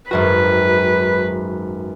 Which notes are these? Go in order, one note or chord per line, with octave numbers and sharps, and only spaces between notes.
G#1 F#2 F#4 B4